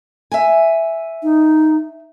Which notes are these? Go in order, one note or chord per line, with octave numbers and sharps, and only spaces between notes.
E5 G#5
D#4